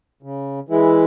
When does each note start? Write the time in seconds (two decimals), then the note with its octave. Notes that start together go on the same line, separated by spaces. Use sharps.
0.22 C#3
0.69 E3 G#3 E4